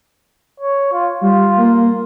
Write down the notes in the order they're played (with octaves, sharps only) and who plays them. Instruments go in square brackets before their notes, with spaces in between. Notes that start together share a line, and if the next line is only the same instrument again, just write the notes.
[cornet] C#5
F4
[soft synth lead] G3 [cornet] F4
[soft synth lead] A#3